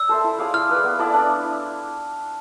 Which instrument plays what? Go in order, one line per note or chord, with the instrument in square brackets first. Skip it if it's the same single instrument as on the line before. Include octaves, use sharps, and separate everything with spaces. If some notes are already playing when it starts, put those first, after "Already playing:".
Already playing: [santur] D5 [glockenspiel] E6
[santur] A4 C5 E5
E4
G#4 D5 F5
[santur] E4 [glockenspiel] F6
[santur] G#4 B4 D5
B3
E4 A4 D5
D4